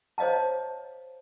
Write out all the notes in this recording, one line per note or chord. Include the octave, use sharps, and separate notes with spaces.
C5 C#5 D#5 F5 A5